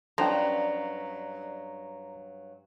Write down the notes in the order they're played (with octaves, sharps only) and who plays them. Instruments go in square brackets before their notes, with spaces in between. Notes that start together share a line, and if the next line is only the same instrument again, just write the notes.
[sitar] G2 F#3 [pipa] F3 [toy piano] C#4 A4 [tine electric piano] A#5